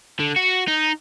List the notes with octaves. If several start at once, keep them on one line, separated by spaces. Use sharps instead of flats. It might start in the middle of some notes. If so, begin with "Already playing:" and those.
D3
F#4
D#4